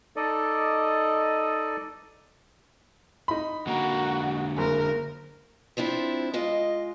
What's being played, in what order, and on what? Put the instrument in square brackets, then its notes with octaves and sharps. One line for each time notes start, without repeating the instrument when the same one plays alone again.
[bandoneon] D#4 A4 D5 D#5
[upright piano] D#4 B5
[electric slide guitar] D3 A#3 A#5 [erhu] F#4
[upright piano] F#1 [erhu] A#4
[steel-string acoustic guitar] F3 C4 D4 E4
G#3 F4 D#5